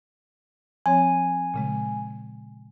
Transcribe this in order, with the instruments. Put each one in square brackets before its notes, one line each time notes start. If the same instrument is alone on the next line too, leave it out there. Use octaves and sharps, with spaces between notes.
[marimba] F3 C4 C#5 [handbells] G#5
[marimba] A#2 C#3 G#3